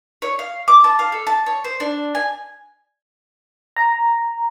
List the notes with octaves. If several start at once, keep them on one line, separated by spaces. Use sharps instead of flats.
C#5
F5
D6
A5
F5
A4
A5
C#5
C5
D4
G#5
A#5